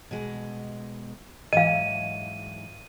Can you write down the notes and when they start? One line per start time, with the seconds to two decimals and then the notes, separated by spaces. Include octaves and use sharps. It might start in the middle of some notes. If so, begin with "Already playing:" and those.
0.11 B2 G#3
1.53 G#2 E3 F#3 D#5 F5 D#7